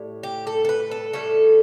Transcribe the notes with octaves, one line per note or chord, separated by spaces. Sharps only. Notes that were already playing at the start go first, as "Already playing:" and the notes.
Already playing: A2 G3
G4
A4
A4
B4
A4
A2 G3 A4